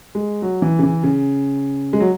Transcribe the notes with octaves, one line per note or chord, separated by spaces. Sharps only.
G#3
F#3
E3
C#3
E3
C#3
G#3
F#3